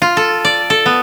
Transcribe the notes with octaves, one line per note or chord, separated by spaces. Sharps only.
F4
A4
D5
A4
B3